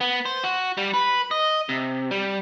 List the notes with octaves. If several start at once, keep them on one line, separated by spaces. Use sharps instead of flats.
B3
C5
F#4
G3
B4
D#5
C3
G3